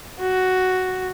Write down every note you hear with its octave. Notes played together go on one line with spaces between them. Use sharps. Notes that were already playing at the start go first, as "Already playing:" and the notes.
F#4